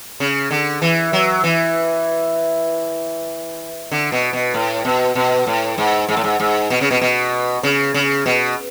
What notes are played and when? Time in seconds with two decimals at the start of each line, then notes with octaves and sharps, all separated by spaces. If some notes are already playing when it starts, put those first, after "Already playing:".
0.20 C#3
0.51 D3
0.82 E3
1.13 F#3
1.44 E3
3.92 D3
4.12 B2
4.33 B2
4.54 A2
4.85 B2
5.15 B2
5.47 A2
5.78 G#2
6.09 G#2
6.17 A2
6.24 G#2
6.40 G#2
6.70 B2
6.81 C#3
6.91 B2
7.01 B2
7.63 C#3
7.94 C#3
8.26 B2